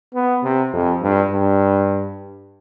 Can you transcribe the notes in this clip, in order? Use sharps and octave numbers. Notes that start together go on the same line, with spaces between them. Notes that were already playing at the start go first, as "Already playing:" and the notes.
B3
C3
F2
G2
G2